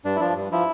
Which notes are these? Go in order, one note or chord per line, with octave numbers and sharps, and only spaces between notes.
G2 D4
E4
F3 D4
G2
F3 E4